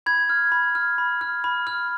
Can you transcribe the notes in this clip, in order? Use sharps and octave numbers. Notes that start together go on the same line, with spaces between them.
B5 G#6
F6
B5
F6
B5
F6
B5
F6